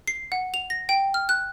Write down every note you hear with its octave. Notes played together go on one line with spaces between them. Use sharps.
C7
F#5
F7
A#6
G5
F6
F#6